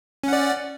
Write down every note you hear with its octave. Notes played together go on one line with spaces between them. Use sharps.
C#4 D5 F#5